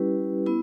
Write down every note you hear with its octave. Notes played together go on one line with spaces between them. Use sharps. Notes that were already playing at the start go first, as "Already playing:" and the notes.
Already playing: G3 C#4 E4 G4 B4
B3 E4